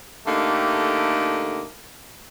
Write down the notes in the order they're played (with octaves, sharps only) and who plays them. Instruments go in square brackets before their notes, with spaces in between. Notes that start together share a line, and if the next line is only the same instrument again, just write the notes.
[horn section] D3 A3 A#3 D#4 G4